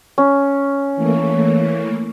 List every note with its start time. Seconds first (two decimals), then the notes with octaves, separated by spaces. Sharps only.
0.18 C#4
0.96 E3 A3 A#3